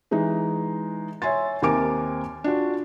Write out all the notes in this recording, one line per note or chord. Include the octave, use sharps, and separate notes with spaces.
E3 G#3 D#4
C#5 E5 G#5 C6 A6
D#2 C4 A#4 G#5 D6 D7
D4 F4 F#4